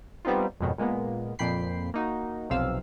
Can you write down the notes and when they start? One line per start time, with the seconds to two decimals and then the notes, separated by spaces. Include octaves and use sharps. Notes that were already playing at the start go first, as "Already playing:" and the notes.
0.25 G3 B3 C4 D#4 F4
0.60 F2 G#2 B2 D#3 F#3
0.78 A#2 G#3 A#3 B3
1.39 F2 A#2 G5 B5 C7
1.94 A#3 D#4 F#4
2.50 B1 F2 C3 F5 E6